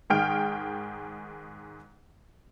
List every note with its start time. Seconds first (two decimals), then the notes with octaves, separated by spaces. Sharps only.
0.10 G#2 D#3 G#4 G5 F6 D7